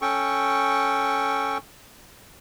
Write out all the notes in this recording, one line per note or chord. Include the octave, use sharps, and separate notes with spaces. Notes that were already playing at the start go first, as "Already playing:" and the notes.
C#4 A4 G5 C#6